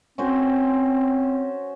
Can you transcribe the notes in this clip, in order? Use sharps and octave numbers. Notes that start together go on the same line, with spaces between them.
C4 C#4 F#4 C5